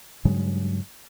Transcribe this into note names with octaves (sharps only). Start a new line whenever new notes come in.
G2 C#3 F#3 G#3